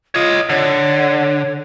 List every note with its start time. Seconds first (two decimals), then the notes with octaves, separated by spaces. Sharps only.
0.15 F4 C#5 D#5
0.49 D3 C#5